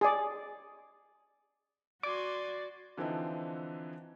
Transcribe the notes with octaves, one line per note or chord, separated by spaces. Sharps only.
G#4 D5
F#4 D5 G#5 C6 D6
D3 E3 F3 C4 D#4 E4